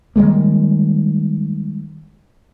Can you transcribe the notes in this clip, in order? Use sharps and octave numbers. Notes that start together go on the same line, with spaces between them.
D#3 G3 G#3 A#3